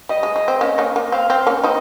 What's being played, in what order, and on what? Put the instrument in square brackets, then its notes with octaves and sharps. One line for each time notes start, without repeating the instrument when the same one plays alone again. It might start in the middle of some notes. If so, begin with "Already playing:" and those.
[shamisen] G3 [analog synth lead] D#5
[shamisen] G#3
G#3
C4
A#3 C#4
A#3 C#4
A#3
[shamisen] C4 [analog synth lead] F5
[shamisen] C4
A#3 C#4
[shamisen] C4 D#4 [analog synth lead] D#5